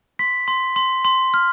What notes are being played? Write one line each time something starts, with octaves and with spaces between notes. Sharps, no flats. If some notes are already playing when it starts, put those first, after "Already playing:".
C6 B6
C6
C6
C6
F6